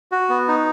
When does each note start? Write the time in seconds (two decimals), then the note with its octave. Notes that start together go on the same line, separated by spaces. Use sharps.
0.12 F#4
0.29 B3
0.48 D#4